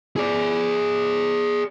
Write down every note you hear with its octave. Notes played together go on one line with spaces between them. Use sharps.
G#4 D5